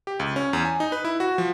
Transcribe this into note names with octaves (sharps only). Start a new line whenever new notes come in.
G4
C#2
C#4
E2
G#5
D#4
B4
E4
F#4
F3